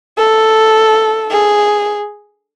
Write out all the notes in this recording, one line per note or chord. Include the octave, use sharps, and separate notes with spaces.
A4
G#4